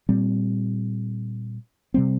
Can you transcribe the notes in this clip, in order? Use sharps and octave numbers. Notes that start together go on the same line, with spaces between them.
A#2 G3 C4
C3 G3 C4